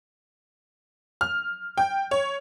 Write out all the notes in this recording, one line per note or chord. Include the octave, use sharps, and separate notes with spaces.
F6
G5
C#5